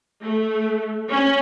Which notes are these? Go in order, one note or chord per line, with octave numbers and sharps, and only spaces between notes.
A3
C#4